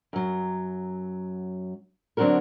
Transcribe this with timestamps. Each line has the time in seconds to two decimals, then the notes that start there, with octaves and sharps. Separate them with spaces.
0.13 F#2 F#3
2.17 D3 F#3 C4 D4 F#4 A#4